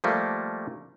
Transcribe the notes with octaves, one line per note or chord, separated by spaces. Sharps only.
F3 G3 A3 A#3